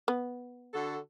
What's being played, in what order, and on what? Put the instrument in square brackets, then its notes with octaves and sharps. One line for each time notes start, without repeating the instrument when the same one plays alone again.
[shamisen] B3
[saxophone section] D3 F#4 A4